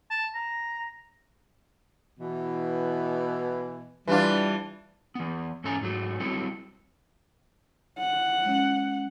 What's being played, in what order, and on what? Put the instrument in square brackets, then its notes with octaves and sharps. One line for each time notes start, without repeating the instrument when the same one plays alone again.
[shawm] A5
A#5
[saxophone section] B2 E3
[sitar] E3 D4 F4 [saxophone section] G3
[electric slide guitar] E3 B3
G#2 E3 C#4 A4 G#5 A#5
G#2 F#3 A3
F#3 G3 C4 E4 A4
[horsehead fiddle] F#5
[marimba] G#3 C#4